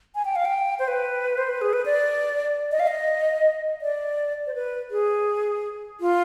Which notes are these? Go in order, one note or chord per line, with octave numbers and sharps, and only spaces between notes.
G#5
G5
F5
G5
C5
B4
C5
B4
G#4
B4
D5
D#5
F5
D#5
D5
C5
B4
G#4
F4